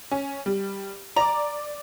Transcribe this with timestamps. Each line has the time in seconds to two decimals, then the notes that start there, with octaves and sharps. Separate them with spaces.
0.11 C#4
0.46 G3
1.16 D5 A#5 D6